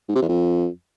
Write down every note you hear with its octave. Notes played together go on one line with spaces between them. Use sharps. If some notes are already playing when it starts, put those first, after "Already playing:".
G#2
C3
E2
F2